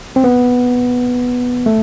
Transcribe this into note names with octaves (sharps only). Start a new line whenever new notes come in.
C4
B3
A3